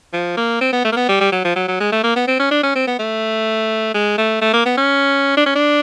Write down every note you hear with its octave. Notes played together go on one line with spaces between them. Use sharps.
F3
A#3
C4
B3
A3
A#3
B3
G3
G3
F#3
F3
F#3
F#3
G#3
A3
A#3
B3
C4
C#4
D4
C#4
C4
B3
A3
G#3
A3
A3
A#3
B3
C#4
D4
C#4
D4